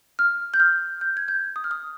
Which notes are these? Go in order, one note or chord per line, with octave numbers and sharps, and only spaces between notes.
F6
G6
F6
G6
G#6
G6
D#6
F6
D#6